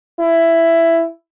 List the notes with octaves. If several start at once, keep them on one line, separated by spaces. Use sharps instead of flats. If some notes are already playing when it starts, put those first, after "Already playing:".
E4